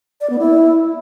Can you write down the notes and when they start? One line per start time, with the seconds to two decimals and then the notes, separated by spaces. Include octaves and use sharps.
0.21 D5
0.30 B3
0.39 E4